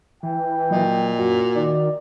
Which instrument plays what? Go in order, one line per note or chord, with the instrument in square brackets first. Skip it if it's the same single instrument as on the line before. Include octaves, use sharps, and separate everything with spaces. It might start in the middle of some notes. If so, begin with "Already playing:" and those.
[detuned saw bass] E3 [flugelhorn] G5
[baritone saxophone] A#2 [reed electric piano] F#3 D#5
[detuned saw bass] F#2 [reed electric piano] F#4
[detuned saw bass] D#3 [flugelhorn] D5